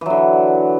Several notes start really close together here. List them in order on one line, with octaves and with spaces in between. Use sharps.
E3 F#3 D3